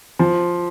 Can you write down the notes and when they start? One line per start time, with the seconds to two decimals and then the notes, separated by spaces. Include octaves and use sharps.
0.19 F3